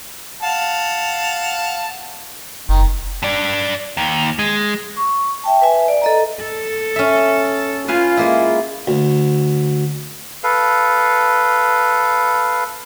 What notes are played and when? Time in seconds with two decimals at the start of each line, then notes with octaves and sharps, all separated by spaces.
0.43 F5 F#5 A5
2.69 F#1 D#3
3.23 G2 D5
3.97 D#2
4.39 G#3
4.97 C#6
5.44 E5 G5 A5
5.62 B4 E5 G#5
5.88 D5
6.02 A4 D#5 A#5
6.41 A4
6.96 C#4 E5
7.88 F4 B4 F5 G#5
8.17 G#3 A#3 E4
8.87 D2
10.44 A4 B4 F5